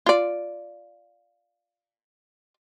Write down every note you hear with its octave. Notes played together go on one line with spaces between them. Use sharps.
F4 D5